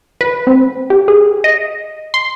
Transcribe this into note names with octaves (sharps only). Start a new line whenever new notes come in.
B4
C4
G4
G#4
D#5
C6